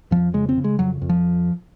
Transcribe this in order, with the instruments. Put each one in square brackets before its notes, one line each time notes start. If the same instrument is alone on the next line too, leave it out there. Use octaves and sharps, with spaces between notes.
[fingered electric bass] F2 F3
C#3 G#3
C4
C#3
G#3
F2 F#3
F2
F3